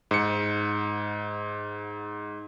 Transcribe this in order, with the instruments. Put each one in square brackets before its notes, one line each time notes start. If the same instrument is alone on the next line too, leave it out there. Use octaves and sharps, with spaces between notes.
[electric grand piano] G#2 C#7